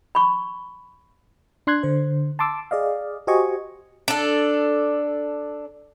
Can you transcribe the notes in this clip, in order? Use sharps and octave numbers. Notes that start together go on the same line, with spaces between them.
B5 C#6
D4 C6 F#6 G#6
D3 C5
A5 C6 D6 E6
G#4 D5 D#5 F5
F#4 G4 C5 D#5 G#5 C#6
D4 A4